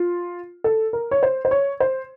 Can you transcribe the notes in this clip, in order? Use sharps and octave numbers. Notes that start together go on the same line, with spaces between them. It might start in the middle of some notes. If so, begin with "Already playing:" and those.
Already playing: F4
A4
A#4
C#5
C5
C5
C#5
C5